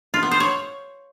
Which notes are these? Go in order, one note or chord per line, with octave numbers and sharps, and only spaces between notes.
F4
B3
C5
C#5